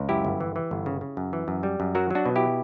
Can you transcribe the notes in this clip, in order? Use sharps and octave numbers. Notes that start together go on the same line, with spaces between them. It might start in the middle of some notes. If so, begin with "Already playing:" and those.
Already playing: C#2
F#2 E4 G4
G1
E3
E3
G1
C#3
C#3
F#2
E3
F#2
G3
F#2
F#3 F#4 A#4
F#3 D4 F#4
B2
E4 G4